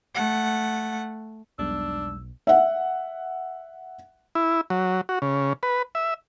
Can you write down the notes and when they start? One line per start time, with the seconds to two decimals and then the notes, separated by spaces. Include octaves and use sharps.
0.15 A3 F#5
1.59 B1 E2 G3 G#3 D4 E6
2.47 E5 F#5
4.35 E4
4.70 F#3
5.09 F#4
5.22 C#3
5.63 B4
5.95 E5